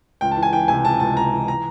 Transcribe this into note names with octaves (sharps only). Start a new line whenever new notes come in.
C#2 G5
A5
E3
G#5
E3 G5
C3 G#5
C#2 A5
C#2 A5
C3 A#5
E3
A#5